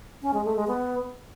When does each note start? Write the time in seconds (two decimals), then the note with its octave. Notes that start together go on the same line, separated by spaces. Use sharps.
0.22 C#4
0.34 G#3
0.45 A3
0.56 G#3
0.67 B3